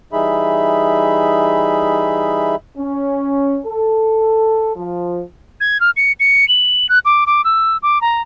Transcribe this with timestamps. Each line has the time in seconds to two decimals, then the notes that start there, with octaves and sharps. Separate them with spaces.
0.13 E3 G3 D#4 G#4 E5 B5
2.77 C#4
3.65 A4
4.76 F3
5.60 G#6
5.80 F6
5.97 C#7
6.20 C#7
6.48 F#7
6.89 F#6
7.05 D6
7.27 D6
7.44 E6
7.83 D6
8.01 A#5